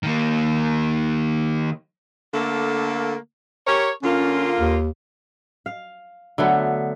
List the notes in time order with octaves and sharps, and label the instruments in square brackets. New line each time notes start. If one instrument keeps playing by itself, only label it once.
[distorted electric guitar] D#3 A#3
[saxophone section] D3 A3 A#3
G4 A#4 C#5
[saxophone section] D3 A#3 F4 [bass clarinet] C#4
[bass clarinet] D#2
[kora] F5
D3 F#3 A3 B3